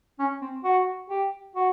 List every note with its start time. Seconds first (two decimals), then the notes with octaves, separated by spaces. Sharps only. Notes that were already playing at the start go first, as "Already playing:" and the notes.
0.19 C#4
0.41 C4
0.64 F#4
1.10 G4
1.55 F#4